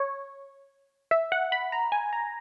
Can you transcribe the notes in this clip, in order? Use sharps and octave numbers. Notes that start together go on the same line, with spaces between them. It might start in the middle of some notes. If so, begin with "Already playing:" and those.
Already playing: C#5
E5
F#5
B5
A#5
G#5
A#5